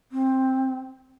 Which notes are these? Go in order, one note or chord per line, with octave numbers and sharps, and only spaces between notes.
C4